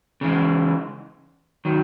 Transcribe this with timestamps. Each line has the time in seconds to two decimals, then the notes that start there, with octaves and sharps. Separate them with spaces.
0.21 C#3 E3 G#3
1.65 D#3 F#3